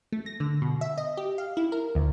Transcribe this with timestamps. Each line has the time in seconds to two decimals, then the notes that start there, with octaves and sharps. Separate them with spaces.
0.12 A3
0.26 A#6
0.40 D3
0.62 B2
0.81 E5
0.98 D#5
1.17 G4
1.38 F5
1.57 E4
1.72 A#4
1.95 D2